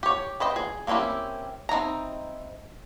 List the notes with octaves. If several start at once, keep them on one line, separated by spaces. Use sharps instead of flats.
G4 C#5
B4 C5 D#5 G5
G#4
A#3 C4 C#4 E4 G4
C4 D#4 E4 A#5